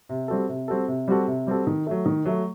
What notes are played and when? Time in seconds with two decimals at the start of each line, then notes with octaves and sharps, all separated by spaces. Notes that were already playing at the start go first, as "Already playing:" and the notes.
0.09 C3
0.28 G3 C4 F#4 A4
0.49 C3
0.68 G3 C4 F#4 A4
0.88 C3
1.08 G3 C4 F#4 A4
1.28 C3
1.47 G3 C4 F#4 A4
1.67 D#3
1.87 F#3 A3
2.06 D#3
2.25 F#3 A3